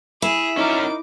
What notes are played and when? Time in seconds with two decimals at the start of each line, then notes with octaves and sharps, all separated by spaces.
0.22 E4 G#4
0.57 C#4 D#4 A#4 D6